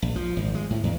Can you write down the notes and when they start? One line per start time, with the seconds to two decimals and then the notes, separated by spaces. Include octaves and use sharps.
0.02 A#1
0.16 F3
0.36 G#1
0.55 G#3
0.70 A2
0.83 E2